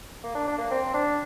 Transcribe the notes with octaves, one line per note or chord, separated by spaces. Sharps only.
A#3
D4
D4
A#3
C4
D4